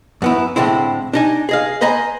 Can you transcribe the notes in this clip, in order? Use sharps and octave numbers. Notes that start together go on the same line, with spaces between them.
F#2 B3 E4
A2 D3 G#3 C4 E4
D4 D#4 G#5
G#4 D#5 F5
B4 C5 D#5 G#5 A#5 B5